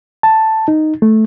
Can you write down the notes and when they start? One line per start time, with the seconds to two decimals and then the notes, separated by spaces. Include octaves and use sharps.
0.23 A5
0.68 D#4
1.02 A3